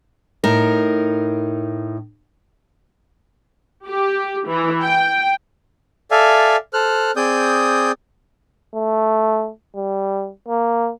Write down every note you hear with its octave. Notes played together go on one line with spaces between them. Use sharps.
A2 D#4 A#4
G4
E3
G5
A4 D5 E5 F5 G#5
A4 C5 F6 F#6
C4 G#4 D5 D#6 G6
A3
G3
A#3